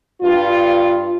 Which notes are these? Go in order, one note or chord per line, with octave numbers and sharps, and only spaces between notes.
G2 F4